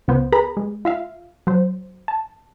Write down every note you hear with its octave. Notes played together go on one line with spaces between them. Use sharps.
C#2 B3 C5
G#4 A#4 B4 A#5 B5
G#3
F4 E5 F5
F#3 C5
A5